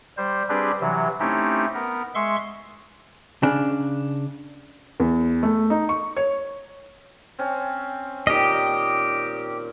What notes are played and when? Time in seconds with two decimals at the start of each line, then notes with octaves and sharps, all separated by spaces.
0.17 G3 C5
0.49 G3 C4 D4 G4 G#4 B4
0.81 C3 E3 F#3
1.20 A3 C4 C#4 D#4 E4 G4
1.74 B3 A#4
2.15 G#3 E5 C6 C#6
3.43 C#3 D4
5.00 E2
5.43 A3
5.70 D#4
5.89 C#6
6.17 C#5
7.39 C4 C#4
8.27 A#2 D#3 G4 D#5